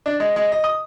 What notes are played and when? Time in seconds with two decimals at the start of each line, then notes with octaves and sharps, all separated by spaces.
0.06 D4
0.20 G#3
0.36 G#3
0.52 D#5
0.64 D#6